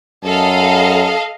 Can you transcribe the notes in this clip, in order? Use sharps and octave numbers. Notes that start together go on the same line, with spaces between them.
F#2 A4 D#5 F5